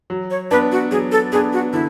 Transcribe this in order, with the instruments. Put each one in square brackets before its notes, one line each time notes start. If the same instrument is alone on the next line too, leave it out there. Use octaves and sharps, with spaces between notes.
[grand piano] F#3
[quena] C#5
[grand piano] B3 D4 [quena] B4
[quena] F#4
[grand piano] F#3 [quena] G#4
[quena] A4
[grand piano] B3 D4 [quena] G#4
[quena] F#4
[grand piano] D3 [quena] E4